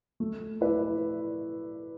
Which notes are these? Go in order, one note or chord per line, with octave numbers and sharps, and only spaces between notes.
A3
E4 B4 D5